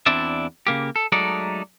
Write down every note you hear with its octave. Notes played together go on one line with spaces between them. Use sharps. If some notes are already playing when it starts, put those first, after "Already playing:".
E2 C4 D4 E4 D5 E5
C#3 A#3 G4
A4
F#3 G#3 A3 D#4 A4 D5